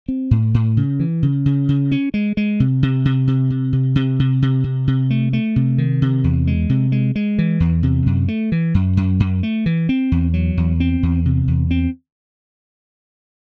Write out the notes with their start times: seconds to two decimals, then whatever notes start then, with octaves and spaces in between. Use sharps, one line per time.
0.08 C4
0.31 A2
0.54 A2
0.77 C#3
1.00 E3
1.23 C#3
1.46 C#3
1.69 C#3
1.92 C#4
2.14 G#3
2.37 G#3
2.60 C3
2.83 C3
3.05 C3
3.27 C3
3.50 C3
3.73 C3
3.95 C3
4.19 C3
4.42 C3
4.64 C3
4.87 C3
5.10 A3
5.33 A3
5.56 C3
5.78 D#3
6.02 C3
6.24 E2
6.47 G#3
6.69 C3
6.92 G#3
7.16 G#3
7.38 E3
7.60 E2
7.83 C3
8.06 F#2
8.28 A3
8.52 E3
8.74 F#2
8.97 F#2
9.20 F#2
9.43 A3
9.66 E3
9.89 C4
10.12 E2
10.34 F#3
10.57 E2
10.80 C4
11.03 E2
11.26 C3
11.48 E2
11.71 C4